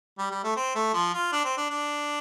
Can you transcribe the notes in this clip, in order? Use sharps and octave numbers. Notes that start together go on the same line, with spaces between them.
G3
G3
A3
C4
A3
F3
F4
D4
C4
D4
D4